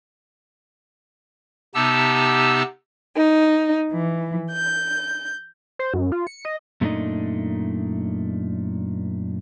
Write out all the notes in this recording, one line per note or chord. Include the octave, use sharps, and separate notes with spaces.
C3 B3 D#4 G4 A5 E6
D#4
E3
G6
C5
F#2
F4
C#7
D#5
F#2 A#2 A3 D4 D#4 D#5